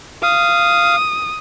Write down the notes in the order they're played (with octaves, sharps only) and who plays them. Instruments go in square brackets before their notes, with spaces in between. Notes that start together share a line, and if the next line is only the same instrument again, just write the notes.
[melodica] F5 [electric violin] D#6